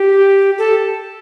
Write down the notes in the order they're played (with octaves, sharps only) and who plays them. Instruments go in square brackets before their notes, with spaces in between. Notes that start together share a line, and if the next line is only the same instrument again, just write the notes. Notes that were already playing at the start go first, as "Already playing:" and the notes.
Already playing: [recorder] G4
A4